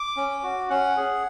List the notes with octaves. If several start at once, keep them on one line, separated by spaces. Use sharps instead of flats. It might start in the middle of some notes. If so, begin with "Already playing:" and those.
Already playing: D6
C#4
F#4
C#4 F#5
G#4